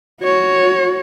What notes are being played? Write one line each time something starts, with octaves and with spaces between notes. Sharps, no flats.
F#4 C#5